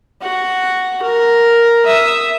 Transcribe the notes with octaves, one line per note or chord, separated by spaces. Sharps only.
F#4 F#5
A#4
E5 D#6